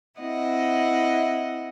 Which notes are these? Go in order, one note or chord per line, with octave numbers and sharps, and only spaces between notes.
C4 E4 D#5 F#5